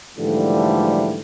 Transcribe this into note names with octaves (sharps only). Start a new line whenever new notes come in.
G#2 D3 E3 F3 G3 A3